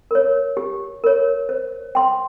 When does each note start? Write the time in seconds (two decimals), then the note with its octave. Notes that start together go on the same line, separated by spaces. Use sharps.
0.11 A#4 C#5
0.57 G4
1.04 A#4 C#5
1.49 C5
1.95 G5 C6